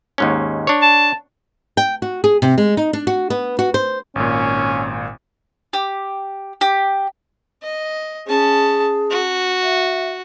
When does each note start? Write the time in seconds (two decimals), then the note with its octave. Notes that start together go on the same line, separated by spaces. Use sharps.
0.18 D#2 G#2 C#4
0.67 D4 C#5
0.82 A5
1.77 G5
2.02 F#4
2.24 G#4
2.42 C3
2.58 G#3
2.77 D#4
2.93 D4
3.07 F#4
3.30 B3
3.59 F#4
3.74 C5
4.16 G#1 A#2 C#4
5.73 G4
6.61 G4
7.63 D#5
8.27 C#4 G#4 A5
9.11 F#4
9.63 E5